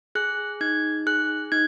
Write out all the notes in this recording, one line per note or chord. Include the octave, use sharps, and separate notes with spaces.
G#4 F#6
D#4 G#6
G#4 F#6
D#4 G#6